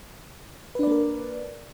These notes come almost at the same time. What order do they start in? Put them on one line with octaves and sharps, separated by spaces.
B4 D4 D5 A#3 A#4